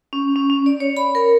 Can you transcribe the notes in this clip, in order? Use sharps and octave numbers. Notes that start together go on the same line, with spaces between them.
C#4
C#4
C#4
D5
C#5
B5
A#4